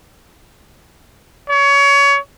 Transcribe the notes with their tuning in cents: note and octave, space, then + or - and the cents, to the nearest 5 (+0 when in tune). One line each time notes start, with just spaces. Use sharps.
C#5 +25